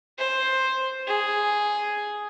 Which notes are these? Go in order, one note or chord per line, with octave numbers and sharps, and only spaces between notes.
C5
G#4